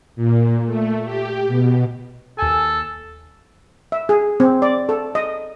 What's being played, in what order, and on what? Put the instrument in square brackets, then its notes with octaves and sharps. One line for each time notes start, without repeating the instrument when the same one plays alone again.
[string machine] A#2
A3
G4
B2
[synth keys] D#2 G#5 [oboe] A4
[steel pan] E5
G#4
C4
D5
A4
D#5